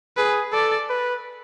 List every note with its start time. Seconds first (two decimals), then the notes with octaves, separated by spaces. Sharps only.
0.17 G#4 B4
0.52 A4 D5
0.89 B4